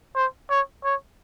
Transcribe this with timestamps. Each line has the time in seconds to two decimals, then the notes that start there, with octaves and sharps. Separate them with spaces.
0.16 C5
0.50 C#5
0.84 C#5